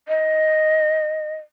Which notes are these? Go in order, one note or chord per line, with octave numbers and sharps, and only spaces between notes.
D#5